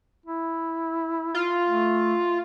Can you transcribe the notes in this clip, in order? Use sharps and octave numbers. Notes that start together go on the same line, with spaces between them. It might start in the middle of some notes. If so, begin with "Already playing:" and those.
E4
F4
A3